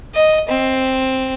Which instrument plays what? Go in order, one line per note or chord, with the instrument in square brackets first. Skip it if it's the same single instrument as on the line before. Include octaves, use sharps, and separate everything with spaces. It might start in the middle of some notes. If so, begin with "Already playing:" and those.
[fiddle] D#5
C4